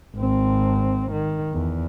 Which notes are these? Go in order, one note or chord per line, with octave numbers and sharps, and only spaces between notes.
G#1 C4
D#3
E2